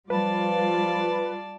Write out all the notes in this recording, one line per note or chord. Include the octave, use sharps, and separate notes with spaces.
F3 G3 F4 B4 D5 A5